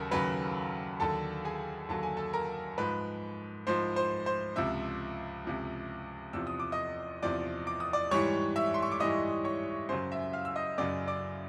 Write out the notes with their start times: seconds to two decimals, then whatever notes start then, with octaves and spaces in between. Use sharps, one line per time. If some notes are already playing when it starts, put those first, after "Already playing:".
Already playing: D#2 C#3 F#3 A4 A#4
0.11 D#2 C#3 F#3 B4 B5
1.00 D#2 D3 F#3 A4 A5
1.45 G#4 G#5
1.89 D#2 D3 F#3 A5
2.03 G#5
2.17 A4 A5
2.33 A#4 A#5
2.78 G#2 F3 B4 B5
3.67 G#2 F3 C5 C6
3.96 C5 C6
4.26 C5 C6
4.56 C#2 C3 F3 E5 E6
5.45 C#2 C3 F3
6.33 E2 C3 F3 E6
6.47 D#6
6.59 D6
6.72 D#5 D#6
7.22 E2 C3 F3 D5 D6
7.67 D6
7.80 D#6
7.93 D5 D6
8.11 G#2 E3 G3 C#5 C#6
8.56 E5 E6
8.74 C6
8.82 C#6
8.91 D6
9.00 G#2 E3 G3 D#5 D#6
9.44 C#5 C#6
9.89 F#2 C#3 F#3 C5 C6
10.12 E5 E6
10.33 F5 F6
10.45 E6
10.56 D#5 D#6
10.78 F#2 C#3 F#3 D5 D6
11.07 D5 D6